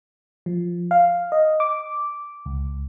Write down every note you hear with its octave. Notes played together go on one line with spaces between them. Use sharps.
F3
F5
D#5
D6
C#2